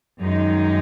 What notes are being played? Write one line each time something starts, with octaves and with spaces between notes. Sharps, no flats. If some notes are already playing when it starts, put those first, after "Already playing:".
F#2 D#3 G#3 D#4